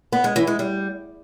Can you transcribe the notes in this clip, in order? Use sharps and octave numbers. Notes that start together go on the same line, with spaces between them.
B3
G#3
E3
G#3
G3